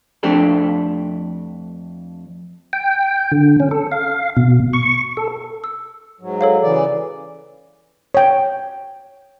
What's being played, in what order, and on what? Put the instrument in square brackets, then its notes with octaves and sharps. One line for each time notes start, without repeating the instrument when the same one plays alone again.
[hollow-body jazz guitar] F2 A3 C4 D4 G4 A4
[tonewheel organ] G5
D3
C#4
A4
F5
B2
C#6
A4
[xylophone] E6
[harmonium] G#2 F#3
[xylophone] A4 C#5 F5
[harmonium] C#3 E3 D5
[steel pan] C#5 G5